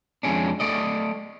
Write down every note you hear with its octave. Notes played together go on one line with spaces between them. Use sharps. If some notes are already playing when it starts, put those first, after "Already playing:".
F2 G#3 C#4 D4
A3 A4 D5 D#5